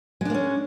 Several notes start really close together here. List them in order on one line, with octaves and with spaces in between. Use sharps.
G#3 D4 A#3 C#4